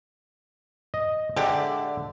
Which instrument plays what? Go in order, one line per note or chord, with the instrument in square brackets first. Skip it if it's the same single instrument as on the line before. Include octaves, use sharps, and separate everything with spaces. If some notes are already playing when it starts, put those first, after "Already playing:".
[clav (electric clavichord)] D#5
[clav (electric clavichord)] D3 E5 [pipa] G#3 G4 D5